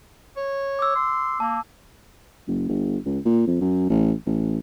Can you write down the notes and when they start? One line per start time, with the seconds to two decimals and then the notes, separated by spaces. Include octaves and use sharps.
0.36 C#5
0.79 D6 E6
0.95 C6
1.40 A#3 A5
2.48 F#1
2.68 G1
3.05 C#2
3.25 A#2
3.47 F2
3.61 F#2
3.89 A1
4.26 A1